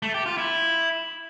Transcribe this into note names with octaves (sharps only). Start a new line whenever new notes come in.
A3
G4
F4
E4